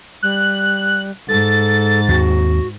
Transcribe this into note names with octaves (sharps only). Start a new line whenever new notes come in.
G3 F#6
G#2 A4 A6
D#2 G#3 C4 F#4